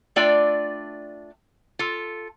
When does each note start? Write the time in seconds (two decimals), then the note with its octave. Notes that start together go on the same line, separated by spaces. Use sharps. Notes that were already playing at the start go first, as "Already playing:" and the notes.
0.16 A3 D4 F4 D5 G5
1.79 F4 A4